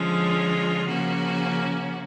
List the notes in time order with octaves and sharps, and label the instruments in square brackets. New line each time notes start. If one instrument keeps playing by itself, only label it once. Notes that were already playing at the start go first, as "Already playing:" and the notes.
Already playing: [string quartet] D3 F3 G#3 C#4 F4
C#3 F3 A#3 C#4 F#4